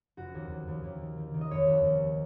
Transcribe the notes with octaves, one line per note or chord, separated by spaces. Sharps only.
F1 F#4
D#2
D#2
D#2
D#2
D#3
D#3
D#3
D#5
F1 C#5
D#2
D#2